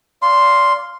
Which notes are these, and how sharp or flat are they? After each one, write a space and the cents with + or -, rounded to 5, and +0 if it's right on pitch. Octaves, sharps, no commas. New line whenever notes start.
D5 -25 F5 -5 C6 +0